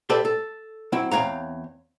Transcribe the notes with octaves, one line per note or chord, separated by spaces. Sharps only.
G4 A4 B4 C5 D5 E5
A4
F#3 C4 E4
E2 C4 C#5 F5 A#5